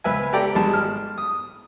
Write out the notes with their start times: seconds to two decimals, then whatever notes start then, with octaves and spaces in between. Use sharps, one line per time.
0.04 C#2 B4 E5 G#5
0.33 G4 A4 D5 G5 A#5
0.55 G#1 G3 G#3 A5
0.73 F6
1.18 D#6